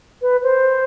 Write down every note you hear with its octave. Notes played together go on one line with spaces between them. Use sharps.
B4
C5